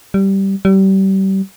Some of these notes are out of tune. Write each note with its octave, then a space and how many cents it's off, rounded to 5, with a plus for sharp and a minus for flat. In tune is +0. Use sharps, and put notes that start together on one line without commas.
G3 -10
G3 -30